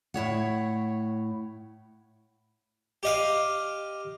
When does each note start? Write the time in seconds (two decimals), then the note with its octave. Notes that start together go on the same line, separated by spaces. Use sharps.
0.14 A2 E4 C#5 F#5
3.03 G4 D#5 F5